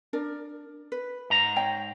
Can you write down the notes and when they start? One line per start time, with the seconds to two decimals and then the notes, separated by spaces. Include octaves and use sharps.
0.13 D4 A#4 D5
0.92 B4
1.30 G#2 A#5
1.56 C#5 D#5 G5